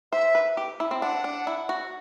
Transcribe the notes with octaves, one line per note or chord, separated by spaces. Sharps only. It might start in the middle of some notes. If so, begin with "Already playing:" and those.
C5 E5
B4
G4
E4
C4
D4 F#5
D4
E4
F#4